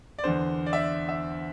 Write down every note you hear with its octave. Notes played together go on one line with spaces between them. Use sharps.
D5
E2 D3 C5
D5
E5
D5
E5